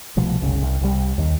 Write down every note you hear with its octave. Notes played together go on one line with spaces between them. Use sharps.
C2 B2 F3 A3
F#1 C2 C#3
C2
C2 G3
D#2 D#3